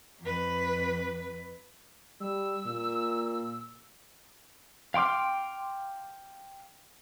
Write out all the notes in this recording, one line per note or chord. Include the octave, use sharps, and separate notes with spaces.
F2 B4
G3 E6
A#2
F5 G5 C6 D6 F6